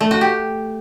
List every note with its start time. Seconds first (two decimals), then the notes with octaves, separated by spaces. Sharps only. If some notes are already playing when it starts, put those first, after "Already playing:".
0.01 A3
0.11 F#4
0.21 G4